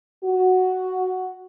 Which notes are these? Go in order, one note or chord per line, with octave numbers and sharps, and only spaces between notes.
F#4